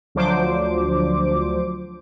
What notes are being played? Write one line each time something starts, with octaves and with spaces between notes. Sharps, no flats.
D2 F3 F#3 D4 C5 D6